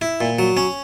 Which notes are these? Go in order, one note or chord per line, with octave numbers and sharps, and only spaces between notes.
E4
A#2
F#3
C#4